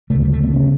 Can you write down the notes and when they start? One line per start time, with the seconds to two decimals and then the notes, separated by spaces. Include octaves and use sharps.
0.10 C#3 A3
0.15 D2
0.22 G3
0.33 A3
0.43 B3
0.54 C#3 C#4